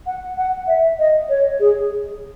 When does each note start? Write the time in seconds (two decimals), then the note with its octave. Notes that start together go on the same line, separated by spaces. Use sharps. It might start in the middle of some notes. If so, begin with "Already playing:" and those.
0.06 F#5
0.37 F#5
0.67 E5
0.99 D#5
1.29 C#5
1.60 G#4